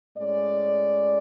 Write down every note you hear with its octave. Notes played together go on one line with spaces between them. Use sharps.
A2 G#3 C#4 D5